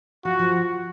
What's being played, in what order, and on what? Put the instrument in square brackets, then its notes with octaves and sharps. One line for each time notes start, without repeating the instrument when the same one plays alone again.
[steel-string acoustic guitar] F3 [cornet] F#4
[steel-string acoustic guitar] F3